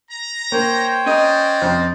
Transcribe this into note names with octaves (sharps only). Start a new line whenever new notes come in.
A#5
A#3 C5 C#5 G5
C#4 A#4 D5 D#5
F2 C4 C5